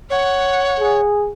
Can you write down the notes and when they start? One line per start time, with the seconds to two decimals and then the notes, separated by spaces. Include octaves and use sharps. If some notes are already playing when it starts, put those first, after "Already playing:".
0.10 C#5 F#5
0.80 G#4